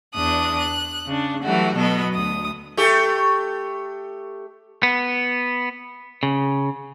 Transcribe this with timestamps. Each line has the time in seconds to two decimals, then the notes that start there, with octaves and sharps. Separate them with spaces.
0.14 E2 D4 D#6 F#6
0.58 F#6
1.07 C#3 D4
1.43 E3 F#3 G3 A3 F#4
1.76 B2 F#3 B3 A4 D#5 B5
2.13 D2 D#6
2.77 A3 G4
4.83 B3
6.23 C#3